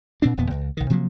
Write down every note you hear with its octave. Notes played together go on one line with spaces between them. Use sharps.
A#2 C4 D4
D#1 E2 A#2 B3
C#2
B1 D#3
C3 F3 F#3 A#3